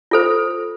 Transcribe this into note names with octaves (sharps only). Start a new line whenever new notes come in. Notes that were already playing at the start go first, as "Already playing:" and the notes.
F4 A4 C5